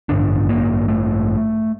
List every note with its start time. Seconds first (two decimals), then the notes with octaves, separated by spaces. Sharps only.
0.09 A1 G2 D3 D4
0.49 A#3
0.88 A3